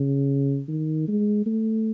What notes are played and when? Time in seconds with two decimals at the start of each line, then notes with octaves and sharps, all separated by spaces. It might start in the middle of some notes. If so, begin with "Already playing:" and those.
Already playing: C#3
0.68 D#3
1.08 G#3
1.46 A3